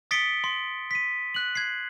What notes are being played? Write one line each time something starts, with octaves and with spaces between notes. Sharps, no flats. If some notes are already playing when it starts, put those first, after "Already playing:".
D#6 A6 B6 C#7 D7 G7
C6
B6 D#7
F#6 F#7
G#6 C7